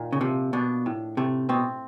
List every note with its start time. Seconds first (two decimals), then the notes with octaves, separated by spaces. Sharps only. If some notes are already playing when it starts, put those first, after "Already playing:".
Already playing: A#2 D#3
0.13 C#3
0.21 C3 F3
0.53 B2 D4
0.86 A2
1.17 C3 A3
1.49 B2 C4